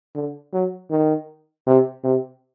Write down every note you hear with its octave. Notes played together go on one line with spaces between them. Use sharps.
D3
F#3
D#3
C3
C3